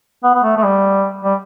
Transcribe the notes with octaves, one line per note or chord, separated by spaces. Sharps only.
B3
B3
A3
A3
G3
G3